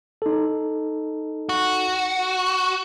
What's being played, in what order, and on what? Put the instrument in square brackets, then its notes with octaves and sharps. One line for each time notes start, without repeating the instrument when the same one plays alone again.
[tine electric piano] D#4 A4
[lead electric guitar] F#4